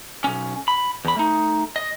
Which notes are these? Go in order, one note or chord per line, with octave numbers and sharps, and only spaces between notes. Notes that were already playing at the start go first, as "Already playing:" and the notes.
B1 C#4
B5
E2 B5
A3 D#4
D#5